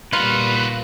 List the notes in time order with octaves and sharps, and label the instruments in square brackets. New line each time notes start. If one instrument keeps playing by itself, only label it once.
[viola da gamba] A#2 G3 [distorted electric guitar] D#4 F#4 [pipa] F4 [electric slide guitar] B4